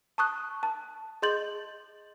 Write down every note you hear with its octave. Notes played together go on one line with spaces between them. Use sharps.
A5 C#6 D#6 F#6
A5
G#4 D#5 C6 G6 A6 F#7